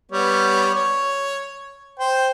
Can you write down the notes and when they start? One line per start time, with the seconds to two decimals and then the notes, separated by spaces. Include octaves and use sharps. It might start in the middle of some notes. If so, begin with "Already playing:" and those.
0.12 G3 B3 C#5
0.74 C#5
1.99 C5 G5